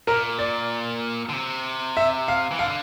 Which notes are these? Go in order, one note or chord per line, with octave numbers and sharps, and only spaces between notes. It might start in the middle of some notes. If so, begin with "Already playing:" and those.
A#2 A#4
D5
D3
C3
E5
F5
E3
D3 F5